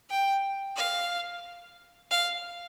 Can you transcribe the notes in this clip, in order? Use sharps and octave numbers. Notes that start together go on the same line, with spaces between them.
G5
F5
F5